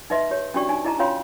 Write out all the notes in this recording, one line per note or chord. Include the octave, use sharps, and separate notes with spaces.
D#4 B4 D#5 E5 C6
G4 C#5
C#4 D4 F#4 G4 D5 C#6
D#4 G#5
E4 G#4 D#5 A5 A#5
C#4 F4 C#5 F5 B5 C6